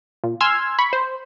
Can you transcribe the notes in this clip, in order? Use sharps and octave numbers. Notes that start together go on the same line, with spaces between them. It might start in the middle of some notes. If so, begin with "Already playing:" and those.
A#2
G#5 C6 E6 F6 G#6
B5 C#6
C5